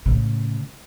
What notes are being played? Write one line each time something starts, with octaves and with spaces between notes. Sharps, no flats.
A2 C#3